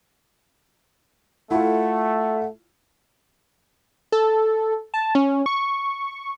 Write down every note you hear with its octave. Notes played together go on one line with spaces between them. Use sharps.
A3 E4 F4 F#5
A4
A5
C#4
C#6